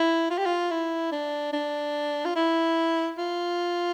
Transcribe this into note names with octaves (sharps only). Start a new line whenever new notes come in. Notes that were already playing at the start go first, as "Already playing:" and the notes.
Already playing: E4
F4
G4
F4
E4
D4
D4
F4
E4
F4